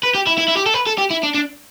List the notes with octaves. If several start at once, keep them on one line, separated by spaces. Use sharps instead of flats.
B4
G4
E4
E4
E4
G4
A4
B4
A4
G4
E4
D4
D4